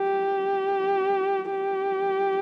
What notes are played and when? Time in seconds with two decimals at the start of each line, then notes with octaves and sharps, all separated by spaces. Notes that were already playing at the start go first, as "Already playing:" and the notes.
Already playing: G4
1.51 G4